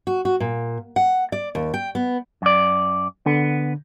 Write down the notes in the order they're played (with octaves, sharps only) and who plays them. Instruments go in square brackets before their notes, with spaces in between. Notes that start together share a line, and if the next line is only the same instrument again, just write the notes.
[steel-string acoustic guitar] F#4
F#4
A#2
F#5
D5
D#2
G5
B3
[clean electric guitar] F#2 D5
[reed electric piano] D3 [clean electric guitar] B3